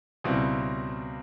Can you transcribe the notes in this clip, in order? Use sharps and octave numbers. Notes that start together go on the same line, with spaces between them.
C#2 B2 G3 C4 E4